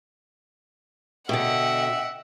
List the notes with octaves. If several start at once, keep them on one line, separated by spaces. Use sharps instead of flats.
B2 D3 D#5 E5 F#5 G5